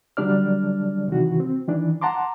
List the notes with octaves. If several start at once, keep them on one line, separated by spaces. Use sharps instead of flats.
D3 F#3 G3 D4 D5 F6
C3 D#3 E3 F#4
C4
D#3 E3 D4
F#5 A5 A#5 C6 D6